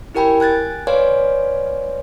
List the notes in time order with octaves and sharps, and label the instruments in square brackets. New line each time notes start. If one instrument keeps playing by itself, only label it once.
[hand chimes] E4 G4 A#4 G5 G#5 B5
G#5 F#6 G#6 A6
B4 C#5 D5 F5 G#5 C6